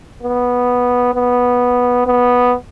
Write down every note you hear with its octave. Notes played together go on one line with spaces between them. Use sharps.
B3
B3
B3